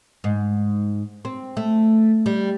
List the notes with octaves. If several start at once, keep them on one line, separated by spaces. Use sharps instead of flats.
G#2
C4
A3
G3